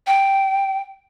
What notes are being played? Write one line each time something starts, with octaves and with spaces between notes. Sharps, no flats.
G5